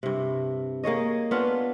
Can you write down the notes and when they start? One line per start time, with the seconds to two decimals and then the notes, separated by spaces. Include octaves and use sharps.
0.03 G2 C3
0.84 A#3 G#4 C#5 D#5
1.31 B3 C#4 D4 F4